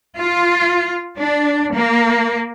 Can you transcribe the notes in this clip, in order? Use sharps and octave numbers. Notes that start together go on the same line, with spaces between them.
F4
D4
A#3